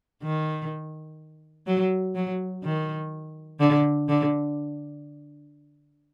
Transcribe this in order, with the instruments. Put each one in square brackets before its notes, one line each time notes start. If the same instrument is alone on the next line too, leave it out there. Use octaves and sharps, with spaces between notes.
[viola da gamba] D#3
F#3
F#3
D#3
D3
D3